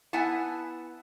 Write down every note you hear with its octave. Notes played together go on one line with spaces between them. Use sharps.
B3 E4 F#5 G#5 A5